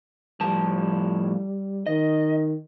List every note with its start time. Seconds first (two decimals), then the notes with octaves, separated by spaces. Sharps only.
0.41 A2 F3 G3 A5
1.87 D#3 D#5